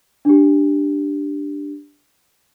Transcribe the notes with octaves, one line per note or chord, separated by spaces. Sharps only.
D4 G4